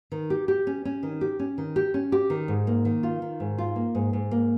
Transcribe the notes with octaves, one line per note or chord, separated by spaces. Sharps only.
D#3
G4
G4
C#4
C#4
D#3
G4
C#4
D#3
G4
C#4
G4
D#3
G#2
A#3
D#3
F4
D#3
G#2
F4
A#3
G#2
G#2
A#3